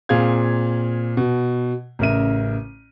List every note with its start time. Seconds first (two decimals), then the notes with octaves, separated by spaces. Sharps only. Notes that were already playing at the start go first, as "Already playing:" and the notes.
0.09 A#2 C4 G#4 F5 G#6
1.17 B2
1.99 A1 C#3 A#4 E5 D#7